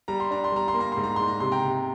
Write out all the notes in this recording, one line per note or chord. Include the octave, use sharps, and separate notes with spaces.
G3 A#5
C6
D4 A#5
C6
G3 A#5
C6
A#3
A#5
G#2 C6
A#5
G#2 C6
A#5
C3 C6
G5 A#5
C3